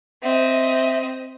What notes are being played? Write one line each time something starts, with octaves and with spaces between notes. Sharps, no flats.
C4 D#5 E5